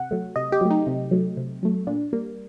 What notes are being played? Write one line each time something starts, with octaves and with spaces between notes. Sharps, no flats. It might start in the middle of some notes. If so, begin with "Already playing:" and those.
Already playing: C3 F#5
F#3 A3
C3 D#5
G4
F#3 A3
D#4
C3
F#3 A3
C3
F#3 A3
A#2 D4
G3 A#3